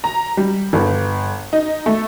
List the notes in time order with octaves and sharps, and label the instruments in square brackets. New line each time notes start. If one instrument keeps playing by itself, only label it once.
[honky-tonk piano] A#5
G3
G1
D#4
A3